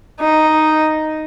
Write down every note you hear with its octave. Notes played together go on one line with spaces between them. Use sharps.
D#4